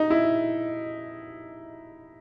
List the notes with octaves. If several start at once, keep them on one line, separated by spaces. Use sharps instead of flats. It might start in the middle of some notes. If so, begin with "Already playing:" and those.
Already playing: D#4
E4